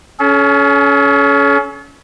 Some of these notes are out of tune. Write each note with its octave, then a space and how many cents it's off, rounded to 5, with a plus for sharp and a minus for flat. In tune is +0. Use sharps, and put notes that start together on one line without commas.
C#4 +20 A4 -40